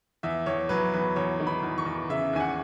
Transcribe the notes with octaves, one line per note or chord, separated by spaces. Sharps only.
E2 E5
E2 C#5
F#3 B4
E2 B4
E2 C#5
D#3
B5
E2
C#6
E2
C#3 E5
D#2 G#5
F#5